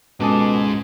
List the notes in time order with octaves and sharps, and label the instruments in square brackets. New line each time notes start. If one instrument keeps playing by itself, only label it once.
[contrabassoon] C#2 [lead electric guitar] G#2 G#3 [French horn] B2 [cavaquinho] G#4 A4 D6